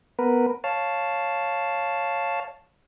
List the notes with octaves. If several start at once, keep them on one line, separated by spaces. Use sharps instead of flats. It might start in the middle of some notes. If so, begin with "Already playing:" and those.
B3 A#4 B4
C#5 F5 A5